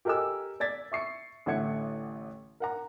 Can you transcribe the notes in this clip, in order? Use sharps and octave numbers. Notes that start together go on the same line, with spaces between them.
G4 A4 A#4 D#5 G#5 E6
D5 G#6 A6 B6
E5 C#6 C7 C#7
A1 D3 A3 F#5 G#6 C#7
A#4 F#5 A#5